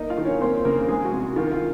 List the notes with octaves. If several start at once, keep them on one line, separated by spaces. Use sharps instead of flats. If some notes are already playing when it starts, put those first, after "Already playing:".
Already playing: A#3 D#4 D#5
F4 F5
D#3
C#4 C#5
A#3 C4 C5
C#3 A#3 A#4
G#3 G#4
F#4
C3
F#4
D#3 F4
F4